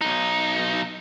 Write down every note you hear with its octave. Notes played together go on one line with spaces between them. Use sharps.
B1 D#4